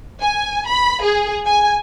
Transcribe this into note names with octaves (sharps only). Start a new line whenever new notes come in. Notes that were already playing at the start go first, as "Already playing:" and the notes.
G#5
B5
G#4
G#5